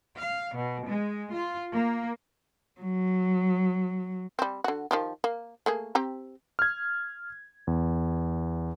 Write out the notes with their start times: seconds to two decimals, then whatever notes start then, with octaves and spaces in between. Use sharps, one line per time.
0.18 F5
0.56 B2
0.89 G#3
1.35 F4
1.72 A#3
2.81 F#3
4.39 G3 C4
4.64 D3 F#4
4.91 D#3 F3 G4
5.24 A#3
5.66 A3 A#3 G#4
5.95 C4 G4 A#5
6.59 F6 G#6
7.67 E2